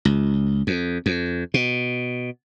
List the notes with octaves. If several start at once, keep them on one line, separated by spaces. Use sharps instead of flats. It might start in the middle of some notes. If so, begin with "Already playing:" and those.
C#2
F2
F2
B2